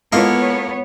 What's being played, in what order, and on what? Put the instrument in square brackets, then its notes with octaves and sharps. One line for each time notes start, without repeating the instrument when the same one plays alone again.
[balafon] G#3 E4 F4 [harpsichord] A#3 A4 F5 [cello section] B3 C#5